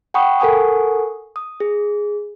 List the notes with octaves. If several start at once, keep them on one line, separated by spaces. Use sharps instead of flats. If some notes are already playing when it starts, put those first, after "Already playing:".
F#5 G5 B5 C#6 D#6
A4 A#4 F#5 G#5 C#6 D#6
D#6
G#4